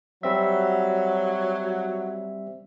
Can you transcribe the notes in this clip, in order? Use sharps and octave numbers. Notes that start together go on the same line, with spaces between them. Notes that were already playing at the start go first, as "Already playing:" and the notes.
F#3 G3 C4 E5